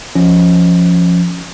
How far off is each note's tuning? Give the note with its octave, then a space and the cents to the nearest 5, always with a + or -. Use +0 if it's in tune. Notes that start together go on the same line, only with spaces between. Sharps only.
F3 +0 C#4 +0